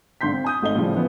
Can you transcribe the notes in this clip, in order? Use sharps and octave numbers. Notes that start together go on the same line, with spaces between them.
G#1 D3 C6 G6 B6
C4
G#5 D#6 G6
G#1 A3 D#4 G7
A2 C#3 F3 G3
E3 F3 B3 E4